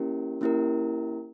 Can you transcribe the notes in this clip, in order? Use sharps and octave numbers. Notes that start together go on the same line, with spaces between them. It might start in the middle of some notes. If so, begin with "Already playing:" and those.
Already playing: A#3 C#4 E4 G4 A#4
A#3 C#4 E4 G4 A#4